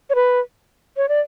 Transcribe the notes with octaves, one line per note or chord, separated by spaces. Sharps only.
C#5
B4
C#5
D5